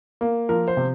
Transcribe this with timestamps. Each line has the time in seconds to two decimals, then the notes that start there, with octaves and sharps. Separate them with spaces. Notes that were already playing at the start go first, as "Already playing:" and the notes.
0.21 A#3
0.49 F3 A#4
0.68 C5
0.77 C3